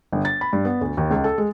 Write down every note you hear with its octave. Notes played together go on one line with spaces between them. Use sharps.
G1
A6
B5
G2
B3
D2
D#2
C#2
A4
G#3